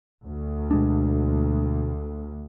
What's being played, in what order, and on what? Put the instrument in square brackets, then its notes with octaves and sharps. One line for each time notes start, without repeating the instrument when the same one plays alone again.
[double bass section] D2
[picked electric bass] B2 G#3 D4